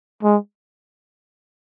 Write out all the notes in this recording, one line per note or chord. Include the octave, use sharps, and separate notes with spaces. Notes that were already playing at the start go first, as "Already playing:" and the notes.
G#3